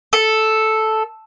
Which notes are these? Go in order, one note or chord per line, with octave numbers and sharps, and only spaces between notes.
A4